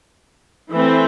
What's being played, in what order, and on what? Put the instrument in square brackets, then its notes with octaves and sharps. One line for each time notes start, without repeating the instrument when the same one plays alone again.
[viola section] E3 A3 C4